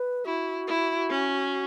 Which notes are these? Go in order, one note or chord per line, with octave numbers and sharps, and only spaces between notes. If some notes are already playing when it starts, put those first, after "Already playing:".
Already playing: B4
E4 F#4
E4
C#4